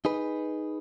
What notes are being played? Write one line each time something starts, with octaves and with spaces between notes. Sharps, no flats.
D#4 G#4 B4